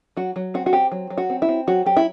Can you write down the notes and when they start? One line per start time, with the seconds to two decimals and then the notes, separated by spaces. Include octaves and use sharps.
0.17 F#3 F#4
0.36 F#3
0.54 C4 F#4
0.66 F#4
0.73 C4 G4
0.92 F#3
1.10 F#3
1.18 F#4
1.30 C4
1.42 E4
1.49 C4
1.67 F#3 F#4
1.86 F#3 G4
1.97 E4